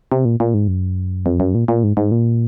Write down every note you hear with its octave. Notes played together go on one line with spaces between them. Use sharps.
C3
A#2
A#2
G#2
F#2
F2
F#2
A#2
A#2
G#2
G#2
A#2